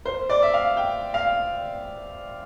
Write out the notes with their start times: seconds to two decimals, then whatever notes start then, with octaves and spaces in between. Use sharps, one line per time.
0.05 C5
0.30 D5
0.42 E5
0.54 F5
0.77 G5
1.14 F5